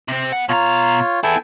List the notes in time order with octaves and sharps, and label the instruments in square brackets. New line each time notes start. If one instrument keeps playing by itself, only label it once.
[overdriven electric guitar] C3 C4
B3 F#5
[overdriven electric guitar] B2 A#5 [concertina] F4 C#5
[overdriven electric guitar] B3 E4 [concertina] A4 G5 G#5